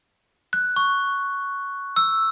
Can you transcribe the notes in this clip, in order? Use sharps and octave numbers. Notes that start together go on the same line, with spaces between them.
F#6
C#6
E6